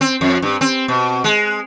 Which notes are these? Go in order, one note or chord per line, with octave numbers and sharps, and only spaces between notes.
C4
F2
G2
C4
B2
G#3